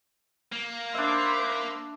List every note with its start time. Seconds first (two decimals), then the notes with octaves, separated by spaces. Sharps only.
0.52 A#3
0.94 D4 C5 E5 B5